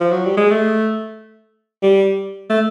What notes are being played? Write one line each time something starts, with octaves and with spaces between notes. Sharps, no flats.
F3
F#3
G3
G#3
A3
G3
A3